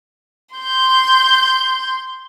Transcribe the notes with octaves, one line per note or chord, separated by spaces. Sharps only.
C6 G6